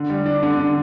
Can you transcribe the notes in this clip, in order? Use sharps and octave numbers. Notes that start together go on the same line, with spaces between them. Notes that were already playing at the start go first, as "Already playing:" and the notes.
Already playing: D3
G3
D4
D3
D3